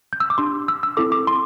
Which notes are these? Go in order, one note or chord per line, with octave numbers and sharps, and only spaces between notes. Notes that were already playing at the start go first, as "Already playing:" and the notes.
G6
E6
D6
D4 G4 C6
E6
E6
C4 E4 A4 D6
D6
C6